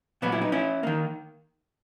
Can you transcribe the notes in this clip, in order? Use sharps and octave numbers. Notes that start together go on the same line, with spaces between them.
A#2 F#3 B3 F#4
E4
D#4
C#4 E4
D#3 A#3